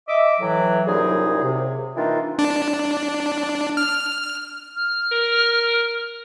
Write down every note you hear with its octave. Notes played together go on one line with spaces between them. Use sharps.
D#5 E5 D6
A2 E3 F#3
C2 F#2 A#2 D#4 G#4
C3
D#3 E3 A#3 D4 D#4 F4
D4
F6
F6
A#4